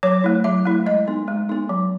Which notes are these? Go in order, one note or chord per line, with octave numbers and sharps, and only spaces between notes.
F#3 C#5
A3 E4
F#3 E5
A3 E4
G#3 D#5
B3 D#4
G#3
B3 D#4
F#3